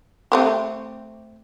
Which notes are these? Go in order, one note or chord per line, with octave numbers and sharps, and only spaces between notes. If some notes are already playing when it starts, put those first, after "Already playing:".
A3 C4 G4